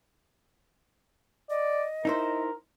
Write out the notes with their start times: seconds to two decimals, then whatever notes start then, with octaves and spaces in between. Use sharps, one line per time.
1.50 D5 D#5
2.05 D#4 E4 A#4 C5